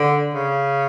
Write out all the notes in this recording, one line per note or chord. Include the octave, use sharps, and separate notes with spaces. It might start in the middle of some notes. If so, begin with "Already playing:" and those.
Already playing: D3
C#3